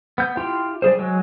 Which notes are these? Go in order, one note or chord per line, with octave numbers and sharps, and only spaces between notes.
B3 G6
E4 F4 G4 G5 C6
G3 G#4 C5
F#3 G#3